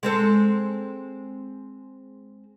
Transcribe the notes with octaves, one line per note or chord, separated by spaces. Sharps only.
G#3 C4 A4